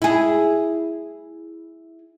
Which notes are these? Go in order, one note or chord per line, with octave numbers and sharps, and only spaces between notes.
E4 G#4